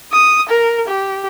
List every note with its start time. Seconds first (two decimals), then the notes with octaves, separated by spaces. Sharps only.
0.13 D#6
0.49 A#4
0.88 G4